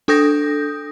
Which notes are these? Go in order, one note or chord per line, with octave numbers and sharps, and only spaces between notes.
D4 A4 D#6 G6 A#6